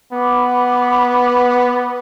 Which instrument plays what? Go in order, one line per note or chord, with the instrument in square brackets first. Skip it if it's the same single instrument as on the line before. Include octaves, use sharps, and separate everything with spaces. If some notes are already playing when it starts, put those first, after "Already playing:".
[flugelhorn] B3 [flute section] B5 D6